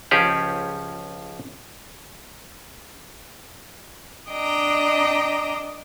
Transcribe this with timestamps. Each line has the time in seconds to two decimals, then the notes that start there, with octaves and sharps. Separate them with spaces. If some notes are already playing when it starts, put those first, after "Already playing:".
0.11 C#2 F3 C#4 G4 G#4
4.30 D4 D#5 G5 A#5